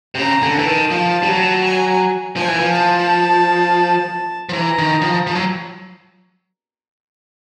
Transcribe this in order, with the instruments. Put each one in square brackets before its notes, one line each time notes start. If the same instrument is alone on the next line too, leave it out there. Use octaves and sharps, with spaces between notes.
[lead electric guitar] C3
[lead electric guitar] C#3 [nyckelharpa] A#5
[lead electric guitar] D3
[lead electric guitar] E3 [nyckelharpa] A5
[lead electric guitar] D#3
F3
G3
F#3
[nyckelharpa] G#5
[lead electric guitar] F3 [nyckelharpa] G#5
[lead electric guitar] E3
F3
[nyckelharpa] A5
[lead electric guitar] F3
[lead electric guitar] E3 [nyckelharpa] A#5
[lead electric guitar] D#3
F3
F3
F#3